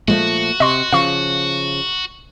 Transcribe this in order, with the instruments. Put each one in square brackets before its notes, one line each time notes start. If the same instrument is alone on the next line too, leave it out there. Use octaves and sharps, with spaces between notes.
[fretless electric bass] A#2 F3 A3 [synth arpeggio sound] G#3 [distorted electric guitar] F#4
[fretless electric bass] C3 [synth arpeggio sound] D#5 C6 C#6
[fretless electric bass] C#3 F3 [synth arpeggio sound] F5 C#6